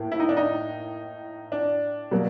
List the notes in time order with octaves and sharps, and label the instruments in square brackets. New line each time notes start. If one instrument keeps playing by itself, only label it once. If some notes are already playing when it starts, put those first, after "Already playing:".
Already playing: [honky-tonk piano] A2 A#3
[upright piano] E4
D#4
D4
D#4
D4
[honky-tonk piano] B2 F#3 A#3